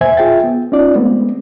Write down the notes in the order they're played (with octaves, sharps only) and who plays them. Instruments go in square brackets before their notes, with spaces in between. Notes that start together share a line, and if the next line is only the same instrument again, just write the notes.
[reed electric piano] E2 A#2 C5 E5 G#5 G#6
F4 G#4 E5 G5 A6
B3
C#4 D#4 F4 D5
G#3 A3 B3 C4